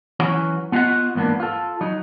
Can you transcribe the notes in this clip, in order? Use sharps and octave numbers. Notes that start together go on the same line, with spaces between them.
E3 F#3 C#4 F#4
B3 F4 F#4 D#5 F#5
E2 G#2 A#3 B3 D4
F4 A4
F#3 D#4